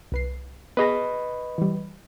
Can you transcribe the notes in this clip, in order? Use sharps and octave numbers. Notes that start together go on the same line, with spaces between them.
C2 B4 C7
B3 G#4 B4 D#5 B5 A#6
E3 G3